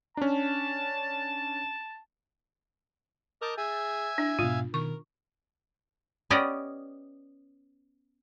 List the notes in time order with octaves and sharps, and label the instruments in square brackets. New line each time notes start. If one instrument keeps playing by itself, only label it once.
[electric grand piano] C#4 D4 [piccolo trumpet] A5
[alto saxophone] A#4 [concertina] D#5 A5 D6 [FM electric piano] E6 G6 A6
[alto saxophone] G#4 [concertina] E5 G#5
[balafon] D4 [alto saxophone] E4
[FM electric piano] G#2 B2 [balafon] F4 [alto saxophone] F5
[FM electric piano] B2 D#3 [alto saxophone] A#4 [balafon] C#6
[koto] B3 C#4 G4 D5 D#5